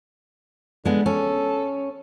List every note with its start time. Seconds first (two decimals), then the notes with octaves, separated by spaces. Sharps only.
0.85 D3 G#3 B3
1.06 C#4 A4